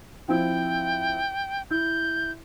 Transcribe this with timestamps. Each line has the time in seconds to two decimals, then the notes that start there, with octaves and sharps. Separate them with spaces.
0.28 F3 C4 E4 G5
1.71 E4 G6